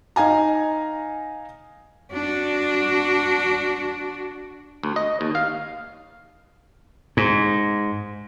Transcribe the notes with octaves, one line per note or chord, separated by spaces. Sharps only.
D#4 F5 G#5 A#5
D4 F#4
D2
D#5
D#2
F5
G#2